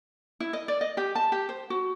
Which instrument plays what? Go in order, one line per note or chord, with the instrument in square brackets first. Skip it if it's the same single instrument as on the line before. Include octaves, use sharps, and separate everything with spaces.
[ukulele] E4
D#5
D5
D#5
G4
A5
G4
C5
F#4